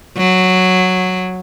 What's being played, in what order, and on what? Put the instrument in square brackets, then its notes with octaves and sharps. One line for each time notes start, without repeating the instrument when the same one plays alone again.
[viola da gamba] F#3